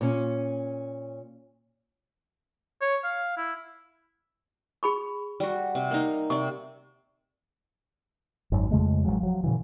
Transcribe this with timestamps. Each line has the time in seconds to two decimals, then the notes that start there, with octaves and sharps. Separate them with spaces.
0.01 A#2 C#4
2.81 C#5
3.04 F5
3.37 E4
4.83 G#4 B5 C#6
5.40 G3 F#4
5.75 C3
5.91 A#3 D#4
6.30 C3 D5 C#6
8.52 G#1 F#2
8.71 F2 C#3 G#3 A3
9.05 A1 F3 F#3 G#3
9.20 F3 F#3
9.44 A#2 C#3 E3